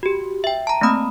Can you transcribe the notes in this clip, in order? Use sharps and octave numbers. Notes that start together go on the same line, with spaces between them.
F#4 G4
E5 G5
A5 A#5
A3 A#3 C4 B5 D#6